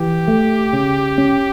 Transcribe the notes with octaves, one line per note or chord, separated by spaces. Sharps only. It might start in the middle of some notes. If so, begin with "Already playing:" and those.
Already playing: E3 G4
A3
C#3
C#4